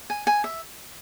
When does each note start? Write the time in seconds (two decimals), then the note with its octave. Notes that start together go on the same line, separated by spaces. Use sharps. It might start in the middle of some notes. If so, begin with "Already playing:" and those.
0.10 G#5
0.27 G#5
0.44 E5